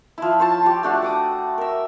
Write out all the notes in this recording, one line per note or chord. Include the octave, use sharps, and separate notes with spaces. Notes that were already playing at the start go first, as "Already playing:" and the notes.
F3 E4
C5 C#5 A5
F4 G4
A3 D4 F#4 F#5
F#5 D6 D#6
A#4 E5